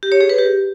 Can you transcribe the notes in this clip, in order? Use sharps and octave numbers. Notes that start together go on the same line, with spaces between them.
G4
C#5
G#4
B4
G4